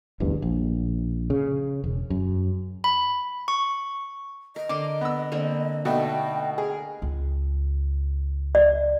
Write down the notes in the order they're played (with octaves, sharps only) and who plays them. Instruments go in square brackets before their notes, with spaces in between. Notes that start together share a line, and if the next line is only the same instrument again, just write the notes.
[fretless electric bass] D1 A1 E2 G2
A#1
C#3
E1
F#2
[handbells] B5
C#6
[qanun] A#4 [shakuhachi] D#5
[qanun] D3 A#4 C6 [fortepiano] D6
[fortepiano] B3 E6
[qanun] D3 A#3 C4
[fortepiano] B2 D#4 [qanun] A3 D4 [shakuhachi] G5
[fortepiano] G#4 [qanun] A#4
[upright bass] C#2
[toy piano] D5